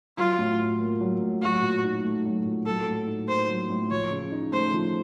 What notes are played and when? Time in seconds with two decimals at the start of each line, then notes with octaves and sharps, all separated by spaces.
0.17 F#3 F4
0.39 A2
0.59 F4
0.81 A#3
1.01 F#3
1.22 A2
1.42 F#3 F#4
1.62 A#2
1.84 D#4
2.04 A3
2.25 F#3
2.45 A#2
2.66 F#3 A4
2.87 A2
3.07 D#4
3.28 A#3 C5
3.49 F#3
3.70 A2
3.91 F3 C#5
4.11 C#3
4.32 D#4
4.53 A3 C5
4.73 F3